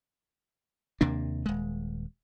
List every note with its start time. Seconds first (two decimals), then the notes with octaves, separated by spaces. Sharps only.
1.01 D#2 C3 A#3 D4
1.46 D#1 G#3